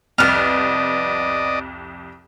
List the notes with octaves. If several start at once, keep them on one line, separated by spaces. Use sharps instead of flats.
C2 F2 B3 D5 D#5 F6